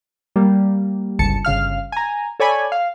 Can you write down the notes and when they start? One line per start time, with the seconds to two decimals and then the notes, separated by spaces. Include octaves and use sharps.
0.36 G3 A#3
1.19 G1 C#2 A5 C#7
1.45 G1 C#3 F5 F6
1.92 G#5 A#5
2.40 A4 C#5 D5 G#5 B5
2.72 F5